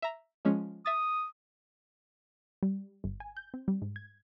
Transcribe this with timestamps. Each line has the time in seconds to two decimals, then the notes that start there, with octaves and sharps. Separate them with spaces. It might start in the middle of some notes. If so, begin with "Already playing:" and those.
0.02 E5 A#5
0.45 F3 G#3 C#4
0.86 E5 D#6 A6
2.63 G3
3.04 G1
3.20 G#5
3.37 G6
3.54 C4
3.68 G3
3.82 G#2
3.96 G#6